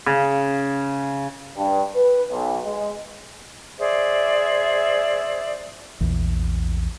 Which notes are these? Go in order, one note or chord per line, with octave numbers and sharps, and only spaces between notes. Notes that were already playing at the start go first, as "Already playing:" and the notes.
C#3
G2
B4
B1
G#3
G#4 C5 D5 E5
A#1 E2